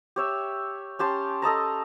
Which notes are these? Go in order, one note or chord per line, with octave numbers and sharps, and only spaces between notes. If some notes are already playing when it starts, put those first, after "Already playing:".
G4 C#5 E5
C#4 G4 A5 C6
A4 D#5 A5 A#5